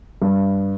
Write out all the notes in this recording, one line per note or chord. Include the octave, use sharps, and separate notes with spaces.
G2